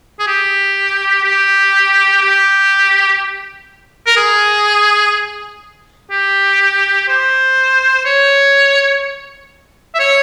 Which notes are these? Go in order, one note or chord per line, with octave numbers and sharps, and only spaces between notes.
G#4
G4
G4
G4
A#4
G#4
G4
C5
C#5
E5
C#5